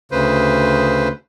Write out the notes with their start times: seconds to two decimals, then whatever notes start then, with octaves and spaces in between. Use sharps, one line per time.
0.12 D2 C#3 B4 C5